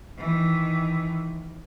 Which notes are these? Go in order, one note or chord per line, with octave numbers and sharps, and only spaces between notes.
D#3 E3